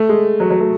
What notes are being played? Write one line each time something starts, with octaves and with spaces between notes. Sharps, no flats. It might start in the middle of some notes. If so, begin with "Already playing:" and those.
Already playing: A3
G#3
F#3
F#3
A3